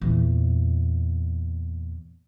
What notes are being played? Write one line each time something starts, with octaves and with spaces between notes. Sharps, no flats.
E2 A#2